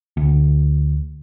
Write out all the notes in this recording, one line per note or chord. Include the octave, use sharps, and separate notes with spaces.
D2